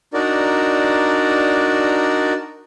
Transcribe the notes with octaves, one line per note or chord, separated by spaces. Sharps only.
D4 D#4 F#4 A#4 D5